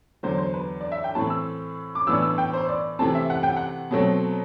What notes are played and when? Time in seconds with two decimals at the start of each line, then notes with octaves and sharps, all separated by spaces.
0.23 E2 D3 F#3 C5
0.38 C5
0.54 B4
0.81 D5
0.92 E5
1.04 G5
1.15 A2 E3 A3 C4 A5
1.30 E6
1.95 D6
2.07 A2 E3 B3 D4 E6
2.22 E6
2.38 G5
2.53 C5
2.69 D5
2.99 C3 E3 A3 C4 A5
3.15 E5
3.30 F#5
3.43 G5
3.56 F#5
3.91 B2 F#3 A3 C4